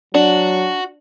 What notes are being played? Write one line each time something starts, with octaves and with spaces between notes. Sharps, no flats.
F#3 D4 F#4